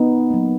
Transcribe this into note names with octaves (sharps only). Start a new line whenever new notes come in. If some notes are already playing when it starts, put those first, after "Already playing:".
Already playing: B3 D#4
F#3 A#3